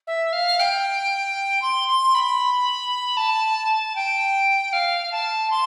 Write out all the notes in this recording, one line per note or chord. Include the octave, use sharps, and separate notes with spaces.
E5
F5
G5
C6
C6
B5
A5
G5
F5
A5
C6